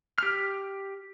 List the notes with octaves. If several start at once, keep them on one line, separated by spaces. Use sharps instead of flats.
G4 F6